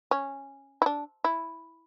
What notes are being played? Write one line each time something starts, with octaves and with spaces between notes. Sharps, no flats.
C#4
E4
D4
E4